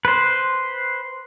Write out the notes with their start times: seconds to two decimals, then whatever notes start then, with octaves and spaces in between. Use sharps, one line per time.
0.05 B4 C5